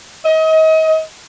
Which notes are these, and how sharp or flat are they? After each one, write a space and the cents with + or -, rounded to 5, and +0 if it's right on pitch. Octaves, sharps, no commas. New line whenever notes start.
D#5 +35